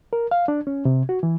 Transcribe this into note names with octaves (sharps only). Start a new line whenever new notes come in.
A#4
F5
D4
C#4
C3
F#4
E3